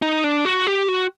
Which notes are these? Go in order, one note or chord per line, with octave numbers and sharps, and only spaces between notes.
D#4
D4
F#4
G4
F#4